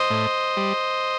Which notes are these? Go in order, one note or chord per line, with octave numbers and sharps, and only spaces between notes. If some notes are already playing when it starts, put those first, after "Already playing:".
Already playing: C5 D#5
A2
G3